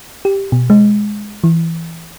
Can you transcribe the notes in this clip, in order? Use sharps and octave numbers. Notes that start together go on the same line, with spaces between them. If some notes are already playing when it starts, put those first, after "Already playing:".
G4
B2
G#3
E3